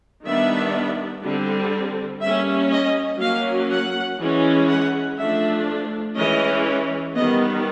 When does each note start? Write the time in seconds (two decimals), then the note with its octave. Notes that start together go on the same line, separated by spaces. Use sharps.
0.25 D#3 G3 B3 D4 E5
1.23 D3 G3 C4
2.22 G3 A#3 C#4 E5
2.72 D#5
3.21 F#3 A#3 C#4 F5
3.70 F#5
4.19 E3 G#3 C#4
4.69 F#5
5.18 F3 A3 D4 E5
6.16 E3 G#3 C#4 D#5
7.15 D#3 G3 B3 D#5